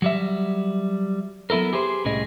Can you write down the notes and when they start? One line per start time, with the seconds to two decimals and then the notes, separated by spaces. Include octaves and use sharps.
0.02 F#3 G3 E5
1.50 F#3 B3 E4 A4 A#4
1.73 G4 G#4 B4 C5
2.05 C2 A2 C#4 G#4 D#5